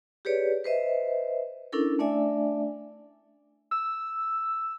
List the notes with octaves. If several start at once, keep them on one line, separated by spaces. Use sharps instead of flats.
G4 G#4 B4 C#5 D5
B4 C5 D#5 E5
C#4 D4 E4 A4 A#4
A3 D4 D5 E5 G#5
E6